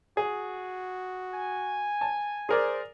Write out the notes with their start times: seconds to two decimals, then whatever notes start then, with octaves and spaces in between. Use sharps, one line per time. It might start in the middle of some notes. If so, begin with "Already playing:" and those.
0.17 F#4 G#4
1.33 G#5
2.01 A5
2.49 G#4 A#4 C5 D5